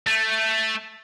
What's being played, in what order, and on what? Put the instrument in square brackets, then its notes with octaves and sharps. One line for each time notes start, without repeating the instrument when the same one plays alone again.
[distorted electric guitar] A3